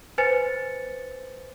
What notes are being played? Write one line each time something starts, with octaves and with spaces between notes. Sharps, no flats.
B4 C5 G#5 A6 C#7